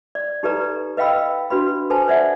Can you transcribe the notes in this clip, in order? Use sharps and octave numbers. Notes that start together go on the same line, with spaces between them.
D5
D#4 G4 A4 B4 D5 A#5
B4 D#5 F5 G5 B5 E6
D4 F#4 B4 B5
A4 B4 C5 G#5 A5
C5 D5 E5 F#5